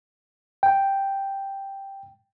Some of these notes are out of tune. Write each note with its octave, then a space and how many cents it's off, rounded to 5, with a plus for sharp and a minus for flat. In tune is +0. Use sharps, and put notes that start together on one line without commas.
G5 +0